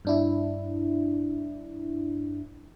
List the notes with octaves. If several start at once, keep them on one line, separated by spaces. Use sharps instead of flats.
G2 D4 E4